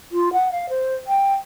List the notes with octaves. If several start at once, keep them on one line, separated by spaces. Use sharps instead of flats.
F4
F#5
F5
C5
G5